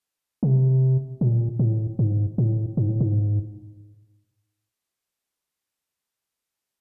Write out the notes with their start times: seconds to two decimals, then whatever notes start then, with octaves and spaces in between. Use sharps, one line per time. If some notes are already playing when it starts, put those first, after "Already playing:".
0.43 C3
1.21 A#2
1.59 A2
1.99 G#2
2.38 A2
2.77 G#2
2.89 A2
3.00 G#2